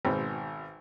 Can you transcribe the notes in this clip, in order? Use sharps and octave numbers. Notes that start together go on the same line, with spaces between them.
G#1 B2 C4 G5